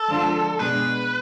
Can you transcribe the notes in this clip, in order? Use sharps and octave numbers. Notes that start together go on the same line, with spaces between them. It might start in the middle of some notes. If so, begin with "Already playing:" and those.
Already playing: A4
D3 F3 G#3 D4 F4
B2 G#3 D4 G#4 B4